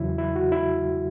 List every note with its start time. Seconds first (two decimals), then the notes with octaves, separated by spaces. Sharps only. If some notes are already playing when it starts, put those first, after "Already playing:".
Already playing: E2 C#3 F#3 E4
0.18 E4
0.36 F#4
0.52 E4